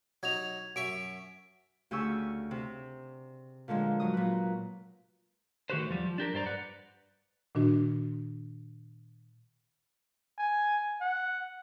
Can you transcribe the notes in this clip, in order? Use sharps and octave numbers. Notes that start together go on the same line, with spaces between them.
F#3 D#4 G#6 F7
F#2 E5 C#6 D7
D2 C#3 G4 G#5 C#6 E6
C3
A#2 D3 F3 G#3
F#3 D#6
A#2 B4
D#3 A3 F#4 G4 B4 C5
E2 F3 G3
F3
D4 G4 A#4
G2 C5 D5 A#5
B4 D5 F#5
A#2 D#3 D4 F#4
G#5
F#5